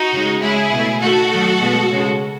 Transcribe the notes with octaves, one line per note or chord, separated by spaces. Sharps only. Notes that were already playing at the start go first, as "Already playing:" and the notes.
Already playing: D#4 F#4
C#3 G#3
C#3 G#3 E4 G#4
B2
A3
D#3 A3 F#4 A4
D#3 F#3 A3
B2 G#3
C#3 G#3